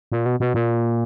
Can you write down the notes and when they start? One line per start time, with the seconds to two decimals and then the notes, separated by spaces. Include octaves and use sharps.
0.12 A#2
0.26 B2
0.40 B2
0.54 A#2